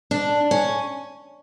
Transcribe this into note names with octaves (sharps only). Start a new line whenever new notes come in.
D4
C#4